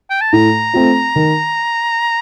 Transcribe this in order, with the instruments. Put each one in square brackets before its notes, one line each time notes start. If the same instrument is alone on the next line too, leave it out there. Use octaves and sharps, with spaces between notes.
[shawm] G5
A5
[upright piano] A2 [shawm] A#5
[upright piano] A3 C4 F4
D#3